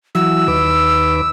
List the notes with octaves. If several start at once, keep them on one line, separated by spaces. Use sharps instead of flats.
E3 F#3 E6
D#2 B4 D6